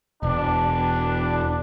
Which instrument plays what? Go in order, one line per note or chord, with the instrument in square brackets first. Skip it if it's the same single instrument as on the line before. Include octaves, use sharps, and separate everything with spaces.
[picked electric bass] E1 [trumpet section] D4